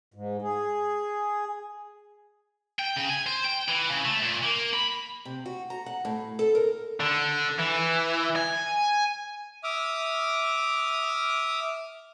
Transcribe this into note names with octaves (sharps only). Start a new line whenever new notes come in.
G#2
G#4
G5
C#3
G#5
C5
G5
E3
C#3
A3
A#2
A#3
B5
C3
F#4
A#5
F#5
A2
A4
A#4
D3
E3
G#5
E5 D6 D#6 F6